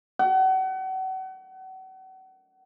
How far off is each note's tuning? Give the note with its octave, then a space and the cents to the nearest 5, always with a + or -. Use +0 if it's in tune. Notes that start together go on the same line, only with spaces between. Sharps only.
F#5 +35